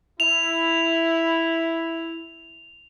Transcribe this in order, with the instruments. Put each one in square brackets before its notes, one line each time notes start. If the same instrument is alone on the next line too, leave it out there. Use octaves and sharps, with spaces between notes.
[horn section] E4 [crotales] F7